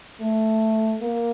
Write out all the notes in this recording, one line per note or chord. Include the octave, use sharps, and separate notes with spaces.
A3
A#3